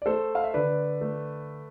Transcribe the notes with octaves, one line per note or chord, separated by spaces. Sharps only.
D5
A3 A4 C5
F5
E5
D3 B4 D5
A3